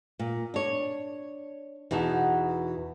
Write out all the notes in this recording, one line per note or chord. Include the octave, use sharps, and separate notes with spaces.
A#2
D4 C#5
E2 B2 D#4 F#4 A5